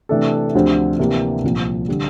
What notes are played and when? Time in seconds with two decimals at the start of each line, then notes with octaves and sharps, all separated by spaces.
0.09 C3 E3 A3 D4 A4
0.54 D2 D3 F3 C4 G4
0.99 C3 E3 A#3 D4 G4
1.44 C2 A#2 F3
1.88 D3 G3